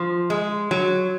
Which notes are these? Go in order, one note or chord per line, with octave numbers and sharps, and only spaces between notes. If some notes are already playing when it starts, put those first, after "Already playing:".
Already playing: F3
G#3
F#3